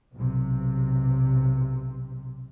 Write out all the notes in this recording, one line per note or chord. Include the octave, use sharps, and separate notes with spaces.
B1 C3